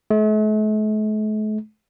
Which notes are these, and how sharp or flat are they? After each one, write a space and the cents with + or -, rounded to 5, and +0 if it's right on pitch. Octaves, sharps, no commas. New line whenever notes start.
A3 -45